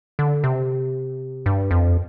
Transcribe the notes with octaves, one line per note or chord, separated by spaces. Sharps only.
D3
C3
G2
F2